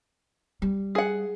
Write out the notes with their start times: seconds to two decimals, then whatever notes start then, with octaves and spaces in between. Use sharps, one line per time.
0.62 G3
0.95 G#4 F#5